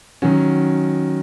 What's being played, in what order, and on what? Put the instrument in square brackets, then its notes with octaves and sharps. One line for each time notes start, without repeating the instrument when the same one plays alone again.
[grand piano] D#3 F#3 C#4 F#4